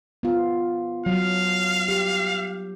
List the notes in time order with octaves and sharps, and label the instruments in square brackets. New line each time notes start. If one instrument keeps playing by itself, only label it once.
[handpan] B3 F4
[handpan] F#3 [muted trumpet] F5
[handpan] G4